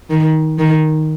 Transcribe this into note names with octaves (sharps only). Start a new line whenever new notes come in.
D#3
D#3